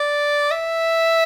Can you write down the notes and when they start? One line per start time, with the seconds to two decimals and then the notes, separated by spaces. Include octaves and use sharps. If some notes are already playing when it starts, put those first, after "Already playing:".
Already playing: D5
0.51 E5